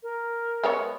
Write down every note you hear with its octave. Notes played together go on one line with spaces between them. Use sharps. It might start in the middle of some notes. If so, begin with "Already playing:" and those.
A#4
G#3 B3 C#5